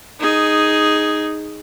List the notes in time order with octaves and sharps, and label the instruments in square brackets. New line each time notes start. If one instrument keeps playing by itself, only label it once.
[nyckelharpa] D#4 G#4